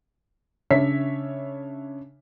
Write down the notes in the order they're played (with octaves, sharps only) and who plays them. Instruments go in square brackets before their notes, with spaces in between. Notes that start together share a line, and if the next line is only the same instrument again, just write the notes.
[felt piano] C#3 D4 C#5 E5 B6